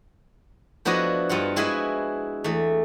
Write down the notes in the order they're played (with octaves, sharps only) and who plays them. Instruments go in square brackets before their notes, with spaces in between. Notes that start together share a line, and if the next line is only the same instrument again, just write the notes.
[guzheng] F3 B3 D4 E4 F#4 D#5
G2 B3 F4 F#5
G#3 E4 F#4 G#4 B4 B5
E2 A3